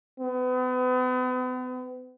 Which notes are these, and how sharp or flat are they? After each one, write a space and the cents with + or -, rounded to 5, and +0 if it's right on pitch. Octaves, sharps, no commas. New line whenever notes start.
B3 +40